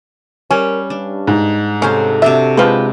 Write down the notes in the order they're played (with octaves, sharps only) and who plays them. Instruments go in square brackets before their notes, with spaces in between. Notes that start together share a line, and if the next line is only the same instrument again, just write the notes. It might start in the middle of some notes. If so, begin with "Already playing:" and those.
[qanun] G3 [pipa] C#4 [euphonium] A#4
[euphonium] G2 [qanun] D4
[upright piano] G#2
[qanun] C3 C5 F5 [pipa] C#4 [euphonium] A4
[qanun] C3 D4 F#4 [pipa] E5
[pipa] F3 G4 B4 [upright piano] G#3